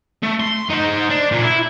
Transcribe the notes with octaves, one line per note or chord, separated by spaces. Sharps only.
A3
C6
D#4 C5
D4
A#2
E4